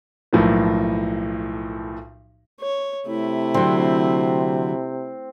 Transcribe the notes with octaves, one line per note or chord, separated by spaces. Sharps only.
B1 A2 F3 A#3
C#5
C3 A3 E4
D3 F#3 C4